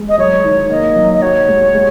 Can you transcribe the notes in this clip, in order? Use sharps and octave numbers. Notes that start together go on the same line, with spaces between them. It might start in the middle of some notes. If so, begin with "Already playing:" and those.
Already playing: G#3
D#5
F#3 C#5
D#3
A#3 D#5
F#3
D#5
F#4 C#5
G#3
G#3